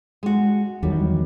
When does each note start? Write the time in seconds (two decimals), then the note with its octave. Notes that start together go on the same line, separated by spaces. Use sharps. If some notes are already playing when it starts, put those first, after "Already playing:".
0.23 G#3 F#4
0.83 E2 D#3 F#3 G3